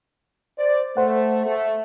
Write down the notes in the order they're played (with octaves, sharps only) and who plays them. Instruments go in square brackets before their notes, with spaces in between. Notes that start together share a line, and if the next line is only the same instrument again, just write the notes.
[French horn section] C5 D5
[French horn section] A3 [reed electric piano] C5 F#5
[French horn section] A3